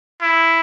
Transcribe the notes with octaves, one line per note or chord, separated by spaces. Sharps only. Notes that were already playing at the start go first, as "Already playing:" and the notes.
E4